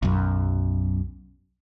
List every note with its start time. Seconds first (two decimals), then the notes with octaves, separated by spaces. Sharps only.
0.03 B1 F#2